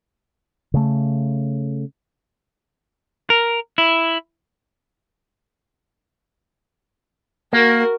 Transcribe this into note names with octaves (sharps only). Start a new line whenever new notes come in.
C#3 A3
A#4
E4
A#3 F#4 A#4